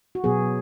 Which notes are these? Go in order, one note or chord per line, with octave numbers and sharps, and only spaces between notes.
F#4
B2 F#3 B3 G#4